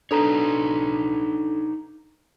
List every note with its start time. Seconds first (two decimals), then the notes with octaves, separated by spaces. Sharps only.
0.11 D4 D#4 A4 B4 C#5 A#5